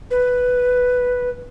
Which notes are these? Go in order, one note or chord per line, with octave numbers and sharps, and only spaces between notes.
B4